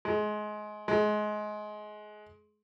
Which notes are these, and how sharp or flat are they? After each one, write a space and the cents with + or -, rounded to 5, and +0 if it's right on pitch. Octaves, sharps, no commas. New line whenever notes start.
G#3 +25
G#3 +25